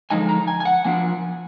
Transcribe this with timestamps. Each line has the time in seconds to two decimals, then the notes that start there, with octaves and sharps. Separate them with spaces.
0.10 D3 F3 G#3 D#4 G#5
0.29 A#5
0.48 G#5
0.60 G#5
0.65 F#5
0.84 F3 A#3 D4 F4 G#5